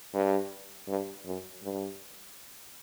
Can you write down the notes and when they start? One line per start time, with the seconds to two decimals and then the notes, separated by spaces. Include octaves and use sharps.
0.13 G2
0.88 G2
1.25 F#2
1.63 G2